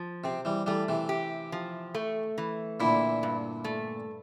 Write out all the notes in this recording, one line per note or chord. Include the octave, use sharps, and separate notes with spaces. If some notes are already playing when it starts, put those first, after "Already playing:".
Already playing: F3
C3 C4
E3 G3
E3 G3 A3
C3 E3
G4
F3
A3
E3
A#2 D3 E4
G2
A3